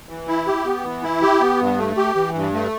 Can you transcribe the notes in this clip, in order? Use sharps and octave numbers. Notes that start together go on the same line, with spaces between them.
E3
E4
G4
B3
E3
E4
G4
B3
G2
A3
G4
E3
G2
A3